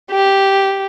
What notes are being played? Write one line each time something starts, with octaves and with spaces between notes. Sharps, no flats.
G4